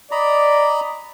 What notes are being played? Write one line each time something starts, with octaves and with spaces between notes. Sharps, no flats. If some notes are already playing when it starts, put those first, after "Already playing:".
D5 D#5 A#5 B5